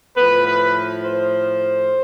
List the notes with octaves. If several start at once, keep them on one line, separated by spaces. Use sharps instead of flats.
A2 F3 B4
B4
C5